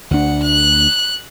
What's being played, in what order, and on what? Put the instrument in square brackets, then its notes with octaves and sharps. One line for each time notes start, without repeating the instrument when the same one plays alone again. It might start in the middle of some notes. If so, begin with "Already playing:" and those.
[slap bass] D2 D4 [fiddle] F#5
[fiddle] F#6